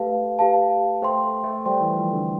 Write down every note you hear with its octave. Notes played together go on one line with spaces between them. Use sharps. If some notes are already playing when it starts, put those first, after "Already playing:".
Already playing: A3 G4 B4 F5 A5
G4 B4 F5 A5
A3 C5 G5 C6
A3
G3 C5 G5 C6
E3
F3
D3